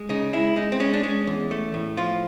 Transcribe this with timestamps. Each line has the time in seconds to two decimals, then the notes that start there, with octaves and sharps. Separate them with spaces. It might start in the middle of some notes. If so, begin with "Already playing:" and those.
Already playing: G#3
0.09 C#3 D#4
0.33 G#3 E4
0.56 G#3 D#4
0.72 C4
0.80 G#3 C#4
0.93 D4
1.03 G#3 C#4
1.27 E2
1.51 A3
1.74 A2
1.97 F3 F4